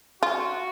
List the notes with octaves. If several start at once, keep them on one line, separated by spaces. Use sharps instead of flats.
F4 F#4